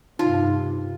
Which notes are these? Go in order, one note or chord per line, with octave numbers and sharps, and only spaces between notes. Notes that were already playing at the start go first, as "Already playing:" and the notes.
G2 C3 D#4 F4